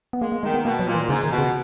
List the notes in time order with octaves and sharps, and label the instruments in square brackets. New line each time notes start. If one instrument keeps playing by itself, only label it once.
[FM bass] B3
[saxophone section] G#3 [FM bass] A#3
[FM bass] A#3
[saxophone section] D#3 [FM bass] G#3
[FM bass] B3
[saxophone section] B2 [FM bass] A#3
[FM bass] F#3
[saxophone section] A#2
[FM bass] E3
[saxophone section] G#2 [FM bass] C#3
[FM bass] D#3
[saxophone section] B2
[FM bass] C#3